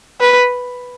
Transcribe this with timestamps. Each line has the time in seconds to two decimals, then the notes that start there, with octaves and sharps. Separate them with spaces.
0.21 B4